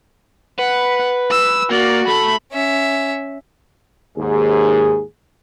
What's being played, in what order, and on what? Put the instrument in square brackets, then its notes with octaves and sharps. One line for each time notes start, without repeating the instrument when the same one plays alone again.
[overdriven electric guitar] B4 [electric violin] F#5
[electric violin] E6
[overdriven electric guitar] A#3 [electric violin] F#4 D5
[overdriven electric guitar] A3 A4 [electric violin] B5
[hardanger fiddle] C#4 E5
[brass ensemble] D#2 G#2 G#4